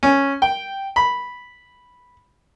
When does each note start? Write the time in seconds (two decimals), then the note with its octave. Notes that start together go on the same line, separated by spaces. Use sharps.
0.03 C#4
0.42 G5
0.96 B5